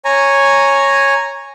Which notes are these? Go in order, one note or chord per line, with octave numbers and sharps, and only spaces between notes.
C#5 G#5 A#5